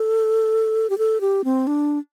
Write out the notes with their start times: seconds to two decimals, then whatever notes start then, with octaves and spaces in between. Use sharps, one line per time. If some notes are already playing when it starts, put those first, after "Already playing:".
Already playing: A4
0.90 G4
0.98 A4
1.21 G4
1.44 C4
1.67 D4